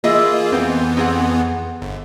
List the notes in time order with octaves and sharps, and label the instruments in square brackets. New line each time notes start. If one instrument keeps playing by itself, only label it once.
[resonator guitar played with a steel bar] E3 D#5 E5 [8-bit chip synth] A#3 F4 G#4
[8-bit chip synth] F2 E3 B3 [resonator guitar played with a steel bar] C4
[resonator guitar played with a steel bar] C4 G#4 F#5
[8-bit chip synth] G1